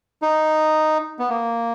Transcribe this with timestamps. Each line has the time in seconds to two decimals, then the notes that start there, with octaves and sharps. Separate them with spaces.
0.22 D#4
1.19 B3
1.29 A#3